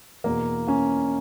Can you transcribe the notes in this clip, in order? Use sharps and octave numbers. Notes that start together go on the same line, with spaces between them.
E2 B2 A#3
A#3 C#4